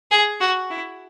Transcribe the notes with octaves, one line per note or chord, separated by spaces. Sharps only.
G#4
F#4
E4